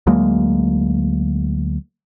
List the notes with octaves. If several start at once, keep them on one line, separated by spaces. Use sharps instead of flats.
D2 F#3 G#3 A#3